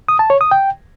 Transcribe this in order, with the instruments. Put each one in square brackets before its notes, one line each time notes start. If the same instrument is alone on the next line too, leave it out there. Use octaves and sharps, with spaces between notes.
[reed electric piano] D#6
A5
C#5
D#6
G5